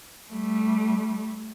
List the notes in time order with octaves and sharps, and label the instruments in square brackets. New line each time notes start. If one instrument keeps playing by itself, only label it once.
[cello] G3 A3